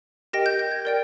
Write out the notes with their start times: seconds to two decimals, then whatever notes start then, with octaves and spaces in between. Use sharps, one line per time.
0.33 G4 A#4 D#5 G5 A#6
0.46 G6
0.59 G6
0.71 G#6
0.85 A#4 D5 G5